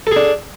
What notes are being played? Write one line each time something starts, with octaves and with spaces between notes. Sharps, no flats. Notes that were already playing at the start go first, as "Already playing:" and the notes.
D4 G#4 A4